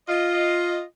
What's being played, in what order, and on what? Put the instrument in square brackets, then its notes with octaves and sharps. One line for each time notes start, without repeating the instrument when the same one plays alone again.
[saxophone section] F4 D#5